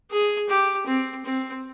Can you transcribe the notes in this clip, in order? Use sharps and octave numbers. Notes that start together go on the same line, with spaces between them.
G#4
G4
C4
C4